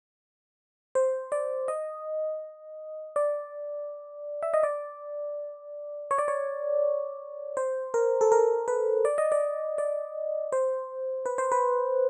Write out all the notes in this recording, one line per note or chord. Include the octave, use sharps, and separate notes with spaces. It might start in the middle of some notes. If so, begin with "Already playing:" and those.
C5
D5
D#5
D5
E5
D#5
D5
C#5
D5
C#5
C5
A#4
A4
A#4
B4
D5
D#5
D5
D5
C5
B4
C5
B4